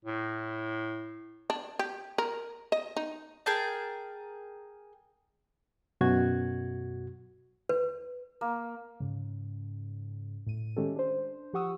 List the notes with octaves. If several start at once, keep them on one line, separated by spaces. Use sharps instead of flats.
A2
D4
G4
A#4
D#5
D#4
G#4 A#4 G5 A5
F#2 B2 F#4 G#6
B4
A#3
G#2 C#3
A2 D#7
D#3 G#3 A3 C#4 G4 A4
D4 C5
F3 G4 F#5 C#6 D#6 E6